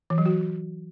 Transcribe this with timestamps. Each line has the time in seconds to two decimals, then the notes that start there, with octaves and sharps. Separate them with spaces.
0.10 E3
0.18 F#3
0.26 F#4